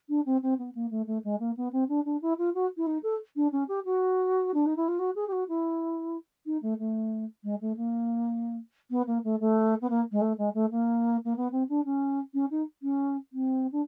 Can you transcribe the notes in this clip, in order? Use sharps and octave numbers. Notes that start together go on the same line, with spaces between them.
D4
C4
C4
B3
A#3
A3
A3
G#3
A#3
B3
C4
D4
D4
E4
F4
F#4
E4
D#4
A4
D4
C#4
G4
F#4
D4
D#4
E4
F4
F#4
G#4
G4
F#4
E4
D#4
A3
A3
G#3
A3
A#3
B3
A#3
A3
A3
B3
A#3
G#3
A3
G#3
A3
A#3
A#3
B3
C4
D4
C#4
C#4
D#4
C#4
C4
D4